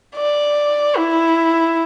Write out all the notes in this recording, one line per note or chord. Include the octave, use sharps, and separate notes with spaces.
D5
E4